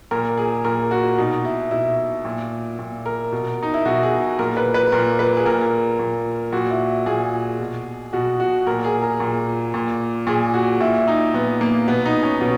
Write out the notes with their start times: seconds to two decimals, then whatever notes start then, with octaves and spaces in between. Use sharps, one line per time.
0.11 A#2 A#4
0.37 G#4
0.65 A#2 A#4
0.91 F#4
1.18 B2 D#4
1.45 E4
1.71 B2 E4
2.25 A#2
2.79 A#2
3.06 A#4
3.32 B2
3.63 D#4
3.74 E4
3.85 B2 F#4
4.03 G#4
4.39 A#2 A#4
4.57 B4
4.74 B4
4.92 A#2 A#4
5.19 B4
5.37 G#4
5.46 A#2 A#4
5.99 A#2
6.52 A#2 F#4
6.71 E4
7.06 A#2 G#4
7.59 B2
8.13 B2 F#4
8.40 F#4
8.67 A#2 A#4
8.84 G#4
9.02 A#4
9.20 A#2
9.74 A#2
10.27 A#2 G#4
10.54 F#4
10.81 A#2 E4
11.08 D#4
11.34 A#2 B3
11.61 A#3
11.88 B2 B3
12.05 D#4
12.23 C#4
12.41 B2 B3